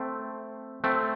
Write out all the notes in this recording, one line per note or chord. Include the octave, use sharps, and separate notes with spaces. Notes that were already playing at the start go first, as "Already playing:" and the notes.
Already playing: A3 C4
A3 C4